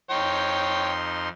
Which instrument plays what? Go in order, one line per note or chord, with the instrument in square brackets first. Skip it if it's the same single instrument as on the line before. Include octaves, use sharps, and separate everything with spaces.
[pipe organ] F2 D#4 C6 [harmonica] C#5 G5